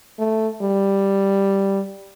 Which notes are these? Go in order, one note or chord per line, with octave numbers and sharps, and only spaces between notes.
A3
G3